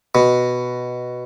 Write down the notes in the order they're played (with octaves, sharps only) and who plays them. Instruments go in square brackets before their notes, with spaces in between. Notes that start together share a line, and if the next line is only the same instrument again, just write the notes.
[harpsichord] B2